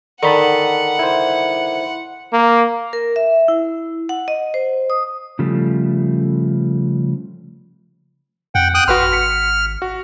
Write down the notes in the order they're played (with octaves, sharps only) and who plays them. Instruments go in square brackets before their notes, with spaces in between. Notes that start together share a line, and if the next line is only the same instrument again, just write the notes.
[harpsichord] D3 D#3 [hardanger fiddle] F#5 [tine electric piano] A5 B5 C#7
[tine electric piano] E4 C5
[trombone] A#3
[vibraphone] A#4
E5
E4
F#5
D#5
C5
D#6
[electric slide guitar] C#3 F3 G3 A3
[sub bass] F2 [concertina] F#5 G5
[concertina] G5 D#6 F#6
[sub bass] G#1 [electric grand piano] F#4 B4 C6 [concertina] F6
[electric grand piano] B6 C#7
F#4